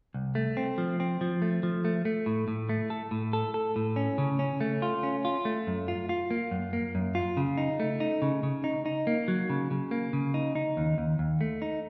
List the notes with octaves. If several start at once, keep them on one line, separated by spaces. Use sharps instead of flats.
C2
A3
C4
F3
C4
F3
A3
F3
A3
A3
A2
A2
A3
A4
A2
A4
A4
A2
C#4
C#3
C#4
A3
F4
C#4
F4
A3
F#2
F4
F4
A#3
F#2
A#3
F#2
F4
C#3
D#4
A3
D#4
C#3
C#3
D#4
D#4
A#3
F#3
C#3
C#3
A#3
C#3
D#4
D#4
D#2
D#2
D#2
A3
D#4